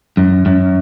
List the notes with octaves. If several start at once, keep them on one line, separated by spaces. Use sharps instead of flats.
F#2
F#2